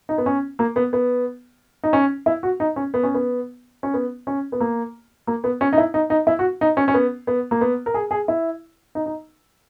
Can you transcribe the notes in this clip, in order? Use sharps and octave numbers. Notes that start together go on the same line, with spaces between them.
D#4
B3
C#4
A#3
B3
B3
D#4
C#4
E4
F#4
D#4
C#4
B3
C#4
B3
C#4
B3
C#4
B3
A#3
A#3
B3
C#4
D#4
E4
D#4
D#4
E4
F#4
D#4
C#4
C#4
B3
B3
A#3
B3
A#4
G#4
G#4
E4
D#4
D#4